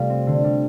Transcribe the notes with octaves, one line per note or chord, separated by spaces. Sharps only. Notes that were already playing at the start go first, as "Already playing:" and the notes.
Already playing: C3 G3 A3 F4
C4
D3
G3